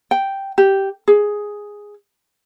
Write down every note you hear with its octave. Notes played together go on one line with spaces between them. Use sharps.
G5
G4
G#4